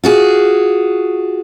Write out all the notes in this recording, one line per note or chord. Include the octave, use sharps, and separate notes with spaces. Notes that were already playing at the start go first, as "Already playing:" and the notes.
F4 F#4 G#4